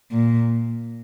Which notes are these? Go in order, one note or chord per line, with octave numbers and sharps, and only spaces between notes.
A#2